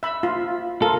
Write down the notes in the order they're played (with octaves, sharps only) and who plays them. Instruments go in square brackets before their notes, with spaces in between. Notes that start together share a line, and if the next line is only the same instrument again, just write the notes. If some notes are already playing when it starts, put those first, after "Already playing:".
[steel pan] E5 B5
F4
[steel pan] F4 A#4 [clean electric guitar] A4